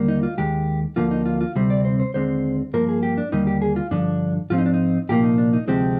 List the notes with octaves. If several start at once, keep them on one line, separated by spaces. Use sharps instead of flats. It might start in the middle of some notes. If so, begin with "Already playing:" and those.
Already playing: D#2 D3 G3 A#3
D#4
F4
D#2 D#3 G#3 G4
D2 D3 F3 A#3 F4
D#4
F4
F4
D2 C3 G3 C4
D5
C5
C5
D#2 D3 G#3 C4 C5
G2 F3 A#3 A#4
G#4
G4
D4
D#2 D3 G3 A#3 D#4
G4
G#4
F4
G2 D3 F3 D4
G#2 F3 C4 F4
D#4
D4
D#4
C2 A#2 F3 A#3 G4
D#4
D4
D#4
D2 C3 F3 G#3 C4 G4